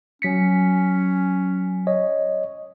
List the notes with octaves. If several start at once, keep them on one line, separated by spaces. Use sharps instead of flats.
F#3 C#4 B6 C#7
C#5 D#5